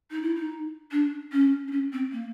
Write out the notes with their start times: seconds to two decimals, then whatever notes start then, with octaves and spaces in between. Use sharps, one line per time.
0.11 D#4
0.22 E4
0.35 D#4
0.91 D4
1.32 C#4
1.67 D4
1.71 C#4
1.92 C4
2.12 A#3